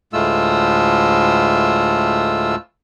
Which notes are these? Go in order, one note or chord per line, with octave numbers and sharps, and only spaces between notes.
D2 A2 G#3 A3 F4 E6